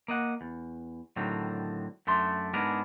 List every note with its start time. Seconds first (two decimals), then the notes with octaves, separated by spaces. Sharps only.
0.08 A#3 D#5 F#5
0.41 E2
1.16 A2 D3 D#3 F#3 C4
2.07 F#2 A3 D4 C6
2.54 G#2 G#3 B3 D4 G#4 A#4